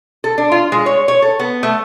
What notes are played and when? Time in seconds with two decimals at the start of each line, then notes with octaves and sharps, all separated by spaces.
0.24 A4
0.38 D4
0.52 F4
0.72 G#3
0.86 C#5
1.08 C#5
1.22 A4
1.39 B3
1.63 A3